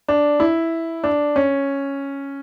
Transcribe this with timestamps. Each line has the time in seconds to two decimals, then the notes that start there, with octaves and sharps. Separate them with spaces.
0.08 D4
0.40 E4
1.04 D4
1.36 C#4